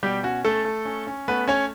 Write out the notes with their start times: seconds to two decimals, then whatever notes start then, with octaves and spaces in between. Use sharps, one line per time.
0.03 B2 G3 G4
0.23 C#4 F#4
0.45 A3 A4
0.65 A3
0.85 C#4
1.07 C#4
1.28 A3 B3 B4
1.48 C#4 C#5